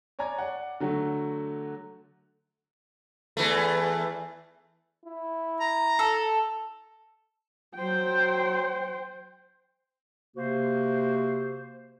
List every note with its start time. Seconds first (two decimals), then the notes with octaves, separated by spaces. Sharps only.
0.19 C#5 D5 G#5 A#5 G#6
0.39 D5 F#5
0.80 D3 F#3 A3 F#4
3.37 E2 E3 A3
5.05 E4
5.61 A#5
5.99 A4
7.75 F#3 C5 G5
10.36 C3 A#3 F#4 C5